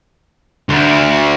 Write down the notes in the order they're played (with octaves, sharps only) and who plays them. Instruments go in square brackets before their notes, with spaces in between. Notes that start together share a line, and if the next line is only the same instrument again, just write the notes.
[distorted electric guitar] D2